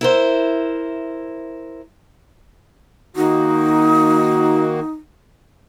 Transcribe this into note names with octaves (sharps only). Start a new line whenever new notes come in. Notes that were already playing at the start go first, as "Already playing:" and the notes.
E4 A#4 C5
D#3 A#3 D#4 F#4